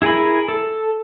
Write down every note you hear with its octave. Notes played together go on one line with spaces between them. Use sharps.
E4 G#4 A#4 G#5 B5
A4